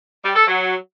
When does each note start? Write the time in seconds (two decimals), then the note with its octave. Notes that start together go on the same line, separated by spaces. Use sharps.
0.24 G3
0.35 A4
0.47 F#3